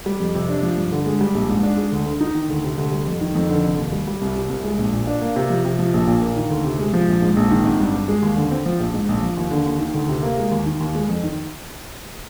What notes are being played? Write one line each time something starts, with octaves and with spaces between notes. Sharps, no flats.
G3
F2
C3
D4
F3
G2
D3
G#3
G3
A#1
G#2
D4
G#3
D2
D3
D#4
D#3
D2
C3
D2
G3
F2
D#3
F2
D3
F1
D#2
G3
G3
C2
C3
C2
G#3
A#1
A#2
D4
A#3
C3
F3
C3
F3
A#1
A#2
A#3
D#3
D2
C3
G#3
F3
A#1
G#2
A#1
D#3
G#1
G2
G3
G#3
D#2
D3
C4
F3
A#1
G#2
A#1
F3
D#2
D3
D#2
D#3
D2
C3
A#3
G#3
D#2
D#3
D#2
G#3
F2
D#3